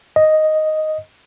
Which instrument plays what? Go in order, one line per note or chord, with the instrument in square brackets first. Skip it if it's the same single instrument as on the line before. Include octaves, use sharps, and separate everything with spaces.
[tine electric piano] D#5